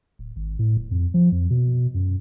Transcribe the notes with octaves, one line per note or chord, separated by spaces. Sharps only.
D1
G#1
A2
D#1
F2
F3
F2
B2
F#2